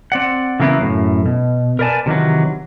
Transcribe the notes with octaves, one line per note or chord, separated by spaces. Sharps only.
C4 D5 F#5
C#3 E3 F#3 A#3 B3 E4
F#2 A2
B2
A#4 B4 D5 G#5 A5
C3 D#3 E3 F#3